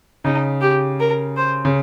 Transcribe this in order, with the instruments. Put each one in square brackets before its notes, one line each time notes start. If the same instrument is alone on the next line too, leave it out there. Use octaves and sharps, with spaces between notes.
[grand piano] C#3 [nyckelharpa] D#4
[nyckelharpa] G4
A#4
C5
[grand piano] C#3